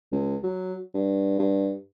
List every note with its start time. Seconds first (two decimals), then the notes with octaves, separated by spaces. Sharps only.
0.12 C#2
0.43 F#3
0.94 G2
1.39 G2